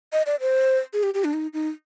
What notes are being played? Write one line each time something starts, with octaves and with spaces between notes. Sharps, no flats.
D#5
D5
C5
G#4
G4
G4
D4
D#4
D#4